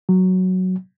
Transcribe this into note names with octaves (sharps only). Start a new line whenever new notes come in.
F#3